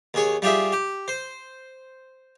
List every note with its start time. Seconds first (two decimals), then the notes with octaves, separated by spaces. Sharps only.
0.14 D#2 G#4 C#5
0.42 G3 F4 G4 G#4 E5
0.72 G4
1.08 C5